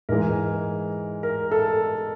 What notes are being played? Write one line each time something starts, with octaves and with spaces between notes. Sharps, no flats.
G#2 E3 G#3 A#4
A#4
A4